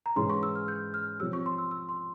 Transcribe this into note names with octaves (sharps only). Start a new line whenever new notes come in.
A#5
G#2 E3 G#3 C#4 C6
C#6
E6
F6
G6
F6
F3 C4 G4 C#5 E6
C#6
C6
E6
E6
C6